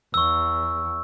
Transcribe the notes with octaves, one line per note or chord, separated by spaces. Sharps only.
E2 C#6 E6